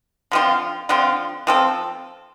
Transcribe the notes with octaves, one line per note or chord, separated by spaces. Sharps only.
D3 F3 C4 F4
D3 F3 C4 F4
F3 C4 A4